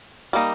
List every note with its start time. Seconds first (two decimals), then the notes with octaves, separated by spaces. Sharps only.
0.33 G3 A#3 D#4